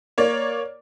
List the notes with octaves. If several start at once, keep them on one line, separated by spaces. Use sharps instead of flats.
A#3 C#5 D5